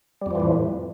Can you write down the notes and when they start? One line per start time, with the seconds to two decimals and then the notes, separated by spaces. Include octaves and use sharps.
0.21 G3
0.26 F2
0.31 F3
0.35 E3
0.40 A2